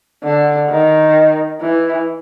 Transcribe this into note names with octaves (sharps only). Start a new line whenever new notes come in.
D3
D#3
E3